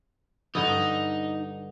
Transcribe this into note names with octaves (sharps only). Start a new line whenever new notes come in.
G2 D3 D#4 D#5